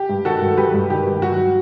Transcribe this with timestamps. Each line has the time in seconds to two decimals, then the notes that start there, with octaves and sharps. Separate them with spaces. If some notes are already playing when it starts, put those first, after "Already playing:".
Already playing: G4
0.09 G2
0.25 D#3 F#4 A4
0.41 G2
0.57 F#3 G4 B4
0.74 G2
0.90 D#3 G4
1.07 G2
1.22 F#3 F#4